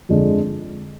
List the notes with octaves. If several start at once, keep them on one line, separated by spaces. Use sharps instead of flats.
F2 D3 G#3 D4